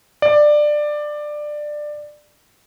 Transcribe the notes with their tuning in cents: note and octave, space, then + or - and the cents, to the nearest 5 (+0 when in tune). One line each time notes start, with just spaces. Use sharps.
D5 +15